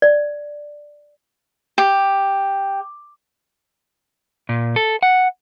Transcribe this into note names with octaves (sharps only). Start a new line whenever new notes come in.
D5
G4
A#2
A4
F#5